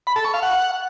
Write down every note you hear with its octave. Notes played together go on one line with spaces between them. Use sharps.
B5
A4
C#6
F5
F#5